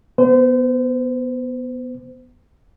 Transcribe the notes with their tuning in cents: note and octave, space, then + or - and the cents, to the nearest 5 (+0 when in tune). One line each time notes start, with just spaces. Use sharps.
B3 +0 C5 -35